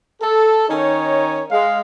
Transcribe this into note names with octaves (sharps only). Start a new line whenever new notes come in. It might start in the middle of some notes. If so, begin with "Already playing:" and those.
A4
D#3 C#4 D#4 C#5
G#3 F5